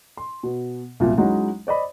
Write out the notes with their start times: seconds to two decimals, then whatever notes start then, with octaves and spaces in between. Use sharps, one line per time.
0.17 C6
0.43 B2
1.00 C2 F#2 A#2
1.18 F#3 G#3 C#4 D#4 E4 F#4
1.67 C5 D5 D#5 B5